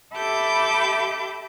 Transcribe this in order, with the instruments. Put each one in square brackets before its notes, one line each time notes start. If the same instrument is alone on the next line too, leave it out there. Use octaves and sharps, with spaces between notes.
[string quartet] G4 A4 E5 B5 D6 G6